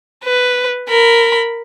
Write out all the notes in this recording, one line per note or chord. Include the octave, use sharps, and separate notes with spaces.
B4
A#4 B5